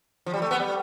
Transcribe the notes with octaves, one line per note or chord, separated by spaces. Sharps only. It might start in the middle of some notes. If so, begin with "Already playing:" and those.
F3
G3
A3
B3
G3